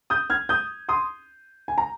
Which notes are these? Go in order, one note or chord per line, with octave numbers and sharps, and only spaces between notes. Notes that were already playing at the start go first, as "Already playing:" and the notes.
D#6 G6
F6 G#6
D#6 G6
C6 D#6
G#5
A#5